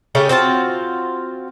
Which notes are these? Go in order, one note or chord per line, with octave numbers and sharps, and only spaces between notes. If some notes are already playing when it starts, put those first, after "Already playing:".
C#3 A3 C#4 G4
C4 F4 F#4 A5